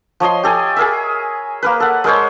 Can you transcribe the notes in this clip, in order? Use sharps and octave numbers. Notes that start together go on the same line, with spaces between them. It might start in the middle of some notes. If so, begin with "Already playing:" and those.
F3 C#5 D#5 C6
G4 A4 G#5
G#4 A#4 E5
A#3 A#4 B4
A4 F#5
G#3 A#4 C5 C#5